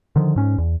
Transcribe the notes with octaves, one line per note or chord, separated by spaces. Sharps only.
D3 D#3 F3
G#2 C#4
E2